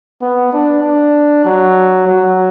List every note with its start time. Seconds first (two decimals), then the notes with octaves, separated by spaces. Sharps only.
0.21 B3
0.53 D4
0.83 D4
1.45 F#3
2.07 F#3